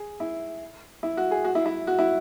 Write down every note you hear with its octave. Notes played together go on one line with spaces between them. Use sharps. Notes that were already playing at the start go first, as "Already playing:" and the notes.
Already playing: G#4
E4
E4
F#4
G#4
F#4
E4
E4
F#4
E4